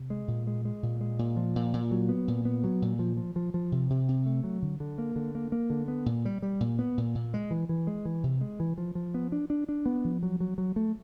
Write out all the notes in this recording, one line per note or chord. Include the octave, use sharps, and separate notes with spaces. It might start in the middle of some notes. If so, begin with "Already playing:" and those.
Already playing: C3
G#3
A#2
G#3
G#3
A#2
G#3
A#2
F3
A#2
A#2
F#3
B3
A#2
B3
F#3
A#2
F3
F3
F3
F3
C3
C3
C3
A3
F#3
D3
D3
A#3
D3
A#3
A#3
D3
B3
A#2
G3
G3
A#2
B3
A#2
A#2
G#3
E3
E3
G#3
E3
C3
G#3
E3
F3
F3
B3
D4
D4
D4
B3
F3
F#3
F#3
F#3
A3